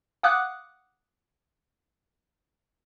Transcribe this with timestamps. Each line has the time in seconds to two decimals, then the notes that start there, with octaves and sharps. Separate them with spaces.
0.23 F5 F#5 D6 D#6 F#6